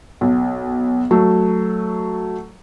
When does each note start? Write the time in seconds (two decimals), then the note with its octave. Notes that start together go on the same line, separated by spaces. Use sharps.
0.21 B1
1.11 F#3 A3